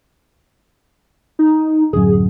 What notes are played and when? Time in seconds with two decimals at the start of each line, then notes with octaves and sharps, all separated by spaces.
1.39 D#4
1.93 D1 F#2 G#4